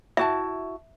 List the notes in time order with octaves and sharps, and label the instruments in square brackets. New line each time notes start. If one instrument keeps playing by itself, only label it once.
[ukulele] E4 F#4 A5 [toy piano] E5